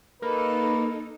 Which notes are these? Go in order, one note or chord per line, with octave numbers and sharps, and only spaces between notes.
A#3 D#4 A4 B4